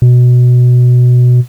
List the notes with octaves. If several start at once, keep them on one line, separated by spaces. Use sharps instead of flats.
B2